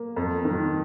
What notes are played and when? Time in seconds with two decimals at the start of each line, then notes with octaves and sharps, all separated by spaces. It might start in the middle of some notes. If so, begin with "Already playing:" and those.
Already playing: A#3
0.16 F2
0.45 D#3